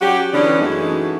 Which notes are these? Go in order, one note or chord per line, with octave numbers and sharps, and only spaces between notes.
F#3 C#4 F#4 G4
D3 E3 B3 C#4 D4
F#2 E3 G#3 A3 D#4 F#4